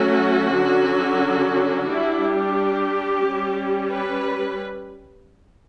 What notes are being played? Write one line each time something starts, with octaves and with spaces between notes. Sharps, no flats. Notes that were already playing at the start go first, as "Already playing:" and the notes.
Already playing: F#3 A3 C#4 F#4
D3 F#3 C#4
G3 D4 E4
G4
G3 C#4
B4